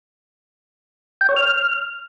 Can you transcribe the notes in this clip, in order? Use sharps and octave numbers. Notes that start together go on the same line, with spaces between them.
G5
C#5
F6